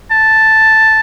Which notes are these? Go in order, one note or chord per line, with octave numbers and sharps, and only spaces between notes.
A5